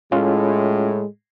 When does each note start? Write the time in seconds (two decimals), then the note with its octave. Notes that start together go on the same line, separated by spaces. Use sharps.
0.12 A2 G#3 C#4 F4